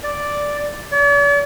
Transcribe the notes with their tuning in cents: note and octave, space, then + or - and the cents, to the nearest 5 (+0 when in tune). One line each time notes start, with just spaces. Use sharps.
D5 +0
D5 -45